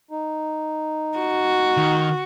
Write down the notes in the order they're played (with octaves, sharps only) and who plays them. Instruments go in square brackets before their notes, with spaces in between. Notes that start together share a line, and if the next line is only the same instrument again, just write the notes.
[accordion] D#4
[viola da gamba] F#4
[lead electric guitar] D#3